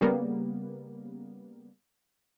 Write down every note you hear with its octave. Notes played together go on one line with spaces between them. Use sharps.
C#3 G3 A#3 B3